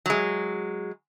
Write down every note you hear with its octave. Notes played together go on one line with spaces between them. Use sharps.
F#3 G#3